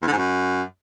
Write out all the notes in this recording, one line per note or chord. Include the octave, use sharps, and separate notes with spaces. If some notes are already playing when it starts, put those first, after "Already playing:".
E2
D3
G#2
F#2